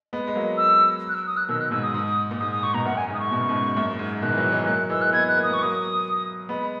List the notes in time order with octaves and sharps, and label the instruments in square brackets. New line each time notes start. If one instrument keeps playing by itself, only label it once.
[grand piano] G#3 B3
G#3
F#3 A#3
[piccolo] E6
F#6
E6
D#6
F#6
[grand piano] B2 D#3 [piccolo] E6
[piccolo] F#6
[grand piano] G#2 B2 [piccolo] E6
[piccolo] D#6
[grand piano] G#2
A#2
[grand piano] G#2 [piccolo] D#6
[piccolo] D#6
[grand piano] G#2 [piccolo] C#6
[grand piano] B2 [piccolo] A#5
[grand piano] F#2 A#2 [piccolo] F#5
[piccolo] G#5
[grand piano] G#2
[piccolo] D#6
C#6
[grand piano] B2
C#3
G#2 B2
F#2 A#2
A#2
G#2
[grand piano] B2 D#3 [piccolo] F#6
[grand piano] E3
D#3 F#3
E3 G#3
F#3 A#3
[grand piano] E3 G#3 [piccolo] E6
[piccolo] F#6
[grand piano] A#3
[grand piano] G#3 B3 [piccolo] G#6
[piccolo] F#6
[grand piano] A#3
[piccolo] D#6
[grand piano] B3 [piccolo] C#6
[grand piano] F#3 A#3 [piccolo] D#6
[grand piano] G#3 B3 [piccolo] B5